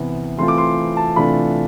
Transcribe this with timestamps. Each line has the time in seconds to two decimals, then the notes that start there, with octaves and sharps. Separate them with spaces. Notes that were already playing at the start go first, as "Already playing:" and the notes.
Already playing: C3 E3 B3
0.38 E3 A3 C4 F4 C6
0.48 D6
0.58 C6
0.97 A5
1.16 C3 E3 A3 D4 F4 B5